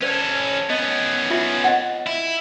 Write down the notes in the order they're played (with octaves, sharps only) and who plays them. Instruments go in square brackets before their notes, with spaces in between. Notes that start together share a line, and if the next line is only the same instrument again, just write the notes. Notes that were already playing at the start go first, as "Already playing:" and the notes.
[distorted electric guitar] C#4 A4 [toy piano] C5 D5
[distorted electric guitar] B3 C#4 [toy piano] D#5
[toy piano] F4 E5
D#5 F#5
[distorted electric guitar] E4